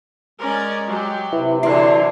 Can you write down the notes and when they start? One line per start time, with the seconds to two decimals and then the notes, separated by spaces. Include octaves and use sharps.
0.40 G#3 C#4 A#4 D5
0.87 F#3 G4
1.32 C3 E4 B4
1.63 D3 E3 F#3 D4 E4 C6